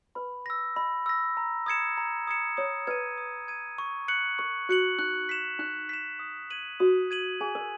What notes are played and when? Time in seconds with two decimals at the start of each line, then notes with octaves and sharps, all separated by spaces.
0.15 B4 B5
0.46 E6 A#6
0.76 D#5 B5
1.06 E6 A#6
1.37 A#5
1.66 D#6 G#6 C#7 E7
1.98 A#5
2.27 D#6 G#6 C#7 E7
2.57 C#5 D#6
2.87 B4 G#6 D#7
3.18 D#6
3.48 G#6 D#7
3.78 C#6
4.08 F#6 C#7 F#7
4.39 A#4 C#6
4.69 F#4 F#6 C#7 F#7
4.99 D#4 F#6
5.29 B6 E7
5.59 D#4 F#6
5.89 B6 E7
6.19 D#6
6.50 G#6 D#7 F#7
6.80 F#4 D#6
7.11 G#6 D#7 F#7
7.41 G#4 G#5
7.55 A#4